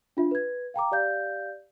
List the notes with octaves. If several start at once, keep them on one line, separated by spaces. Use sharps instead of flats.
D4 F4 E5
B4 G#6
F5 G5 A#5 D6
G4 D5 F5 G6